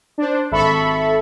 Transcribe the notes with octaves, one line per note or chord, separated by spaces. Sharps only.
D4 C5
G#1 A4 E5 B5 C#6